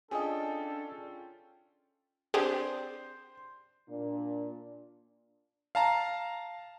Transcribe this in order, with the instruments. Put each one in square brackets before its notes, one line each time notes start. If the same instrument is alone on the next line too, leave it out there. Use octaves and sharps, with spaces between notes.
[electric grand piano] C#4 F4 G5 [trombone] D4 [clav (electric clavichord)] G#4 D#5 [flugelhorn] A4
[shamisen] C4 D4 [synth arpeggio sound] G4 G#4 [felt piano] C5
[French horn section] A#2 D4
[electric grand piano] F5 A5 A#5